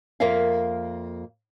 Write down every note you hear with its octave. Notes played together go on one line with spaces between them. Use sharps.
F2 A#3 A#4 E5 F5